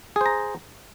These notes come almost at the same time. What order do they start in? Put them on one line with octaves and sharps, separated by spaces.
G#4 C5 A#5